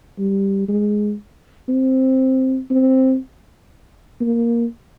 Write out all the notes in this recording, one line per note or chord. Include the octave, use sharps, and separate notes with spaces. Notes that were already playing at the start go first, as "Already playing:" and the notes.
G3
G#3
C4
C4
A#3